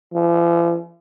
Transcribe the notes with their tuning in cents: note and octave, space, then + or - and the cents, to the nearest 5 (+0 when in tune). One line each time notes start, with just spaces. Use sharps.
F3 -45